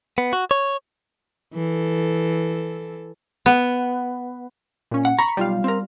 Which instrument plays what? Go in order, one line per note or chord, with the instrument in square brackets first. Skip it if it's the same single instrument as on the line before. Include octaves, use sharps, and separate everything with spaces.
[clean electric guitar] B3
F#4
C#5
[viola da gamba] E3 A4
[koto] B3
[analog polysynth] A#2 C#4
[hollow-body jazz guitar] F#5
[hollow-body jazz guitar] A#5 [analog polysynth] B5 C#6
[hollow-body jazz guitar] B1 [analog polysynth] G3 F4 F5
[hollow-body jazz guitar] C4 A#4